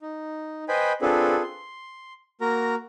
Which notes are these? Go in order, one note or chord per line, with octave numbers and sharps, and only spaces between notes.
D#4
B4 C5 D#5 G5 G#5 B5
C4 D4 F4 G#4 A4 B4
C6
A#3 F#4 A#4 A#5